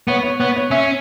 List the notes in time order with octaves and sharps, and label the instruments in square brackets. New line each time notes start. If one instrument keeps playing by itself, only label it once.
[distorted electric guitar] B3 [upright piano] C#5
[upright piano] C#5
[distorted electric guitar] B3 [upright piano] C#5
[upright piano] C#5
[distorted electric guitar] C#4 [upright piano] E5